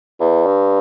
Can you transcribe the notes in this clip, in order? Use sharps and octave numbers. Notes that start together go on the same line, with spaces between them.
E2
G2